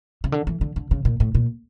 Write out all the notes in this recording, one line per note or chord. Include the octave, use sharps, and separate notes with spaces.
C#3
D3
E3
D3
D3
C#3
A#2
A2
A#2